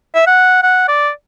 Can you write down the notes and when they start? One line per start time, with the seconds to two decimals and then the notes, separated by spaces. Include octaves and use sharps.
0.15 E5
0.27 F#5
0.63 F#5
0.88 D5